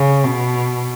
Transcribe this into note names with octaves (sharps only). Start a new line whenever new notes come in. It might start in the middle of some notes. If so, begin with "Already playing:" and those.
Already playing: C#3
B2